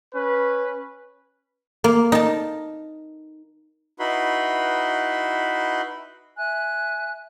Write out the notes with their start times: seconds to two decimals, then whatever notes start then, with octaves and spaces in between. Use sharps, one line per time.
0.15 C#4 B4
1.84 A#3
2.12 D#4 A5
3.99 D#4 E4 F#4 B4 B5 C6
6.37 E5 G#5 F#6